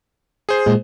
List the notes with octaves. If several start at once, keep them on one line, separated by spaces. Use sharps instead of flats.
G#4 C5
A#2 G#3